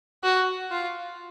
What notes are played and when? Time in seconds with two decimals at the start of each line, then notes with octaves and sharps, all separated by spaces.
0.24 F#4
0.71 F4